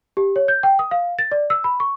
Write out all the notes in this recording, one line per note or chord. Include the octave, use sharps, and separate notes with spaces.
G4
C#5
G6
G5
D#6
F5
A6
D5
E6
B5
C#6